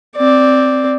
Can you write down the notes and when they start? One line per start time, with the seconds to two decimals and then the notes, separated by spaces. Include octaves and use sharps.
0.16 C4 D5